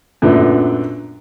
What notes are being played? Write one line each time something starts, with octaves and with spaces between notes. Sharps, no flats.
F#2 A#2 A3 B3 D4